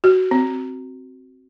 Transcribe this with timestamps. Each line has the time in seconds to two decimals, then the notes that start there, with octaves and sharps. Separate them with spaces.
0.04 F#4
0.31 C4